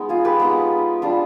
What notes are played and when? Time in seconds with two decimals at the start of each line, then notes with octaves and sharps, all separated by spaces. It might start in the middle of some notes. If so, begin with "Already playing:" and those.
Already playing: G#3 B3 D#4
0.09 F4 G#4
0.25 G4 B4
0.40 G#3 B3 D#4
1.02 G3 D4 F4